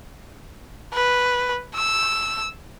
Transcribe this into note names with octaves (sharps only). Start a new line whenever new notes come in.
B4
E6